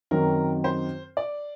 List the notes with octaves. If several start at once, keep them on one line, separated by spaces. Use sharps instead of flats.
F#2 D#3 F#3 C4 F#4 A#4
C5
D5